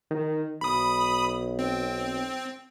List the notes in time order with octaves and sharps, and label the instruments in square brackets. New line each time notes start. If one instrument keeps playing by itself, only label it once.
[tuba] D#3
[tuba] B1 [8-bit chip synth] B5 D#6
[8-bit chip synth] C4